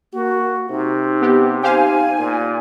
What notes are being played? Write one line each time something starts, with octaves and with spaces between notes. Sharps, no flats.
A#3 F#4
C3 D#4
B3 G4
D#4 G4 C5 F5 G#5
A#2